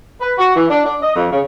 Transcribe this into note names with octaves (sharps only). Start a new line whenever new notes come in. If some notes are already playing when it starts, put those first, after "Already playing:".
B4
F#4
E3
D4
D4
D#5
F2
C#3